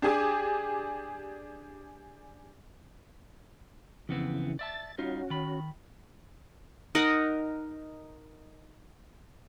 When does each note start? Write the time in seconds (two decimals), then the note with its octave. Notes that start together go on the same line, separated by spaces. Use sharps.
0.02 D4 G4 G#4 G#5 D6
4.09 F2 C#3 E3 B3 C4
4.59 D5 E5 A5 A6
4.98 G3 C#4 D#4 F4 F#4
5.30 D#3 B5
6.95 D#4 A#4 D#5 F#5